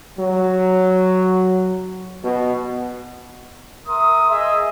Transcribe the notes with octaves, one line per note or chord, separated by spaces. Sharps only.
F#3
B2
A#4 E5 C6 D#6
G#4 D#5 E5